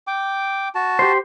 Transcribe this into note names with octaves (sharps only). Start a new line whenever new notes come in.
G5 D6
F#4 A5
G4 C5